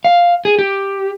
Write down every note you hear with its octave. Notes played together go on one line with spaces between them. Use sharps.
F5
G#4
G4